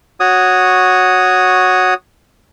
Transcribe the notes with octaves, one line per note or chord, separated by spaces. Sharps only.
F#4 C#5 D#6